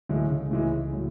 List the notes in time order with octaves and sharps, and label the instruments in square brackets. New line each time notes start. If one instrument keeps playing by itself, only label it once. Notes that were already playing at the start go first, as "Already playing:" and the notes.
[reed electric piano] D2 D3 [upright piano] A2 E3 G#3
[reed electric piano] C#2 C#3
[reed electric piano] C#2 C#3 [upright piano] A2 E3 G#3
[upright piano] A2 F#3